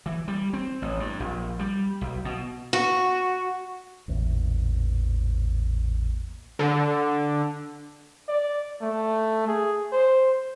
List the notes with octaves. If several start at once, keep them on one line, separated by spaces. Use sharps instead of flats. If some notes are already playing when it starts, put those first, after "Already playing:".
E3
G3
C4
A1
G2
A#1
G3
B1
B2
F#4
A1 E2 A#2
D3
D5
A3
G#4
C5